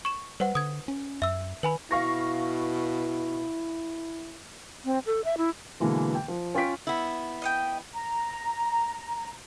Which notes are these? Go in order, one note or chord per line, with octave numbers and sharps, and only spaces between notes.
C#6 E7
G3 B4 C5 F#5
D3 D#6 G#6
C#4
F#2 E5 E6
D#3 B4 G#5 B5
B2 E4 F5 C#6 A#6
C4
A4
E5
E4
B2 D3 E3 G#3 A#3
G5
F3
C#4 F4 G5 C#6 B6 D7
B3 E4
D#5 F#5 G5
A#5